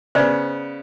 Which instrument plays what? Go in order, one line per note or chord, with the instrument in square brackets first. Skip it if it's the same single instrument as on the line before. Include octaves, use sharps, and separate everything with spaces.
[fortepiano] C#3 B3 [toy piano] C5 D5